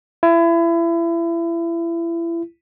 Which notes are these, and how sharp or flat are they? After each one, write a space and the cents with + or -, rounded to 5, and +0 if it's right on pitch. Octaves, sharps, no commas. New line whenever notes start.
E4 +30